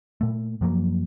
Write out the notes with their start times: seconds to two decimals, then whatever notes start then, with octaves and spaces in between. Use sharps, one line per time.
0.21 A#2 A3
0.61 F#2 F3 F#3 A#3